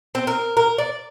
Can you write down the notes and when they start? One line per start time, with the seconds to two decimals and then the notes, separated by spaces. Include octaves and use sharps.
0.15 C4
0.27 A#4
0.57 A#4
0.78 D5